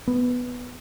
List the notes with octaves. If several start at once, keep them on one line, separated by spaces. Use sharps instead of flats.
B3